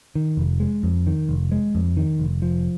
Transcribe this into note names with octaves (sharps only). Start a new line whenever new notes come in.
D#3
F1
G#3
F2
D#3
F1
G#3
F2
D#3
F1
F3